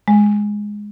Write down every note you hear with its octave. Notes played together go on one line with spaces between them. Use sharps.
G#3